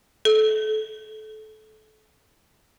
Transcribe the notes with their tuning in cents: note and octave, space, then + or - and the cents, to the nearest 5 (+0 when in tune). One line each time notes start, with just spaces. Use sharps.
A4 -25